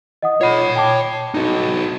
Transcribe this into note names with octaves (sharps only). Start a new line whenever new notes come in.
D#5 F#5 D#6
F4 C#5 B5 C7
G5 A5 D6
D#4 F#4